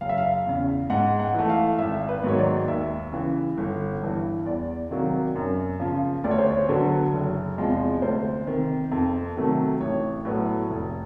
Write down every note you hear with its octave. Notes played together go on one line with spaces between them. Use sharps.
F#1 F5
E5
F5
E2 C#3
G#2 F#5
F#5
E3 A3
F5
G#1 E5
B4
G#2 D#3 F#3 B3 C#5
D5
D#2 E5
C#3 E3
G1
G2 E3
E2 D5
C3 D#3 F#3 A#3
F#2
C#3 F3
D2 D5
C#5
C5
C#5
D3 F#3 B3
F#1
E2 C3 F3 G#3
D2 C5
C3 D#3
F2
C3 D#3 F#3 A3
A1 C#5
A2 F#3 B3
F1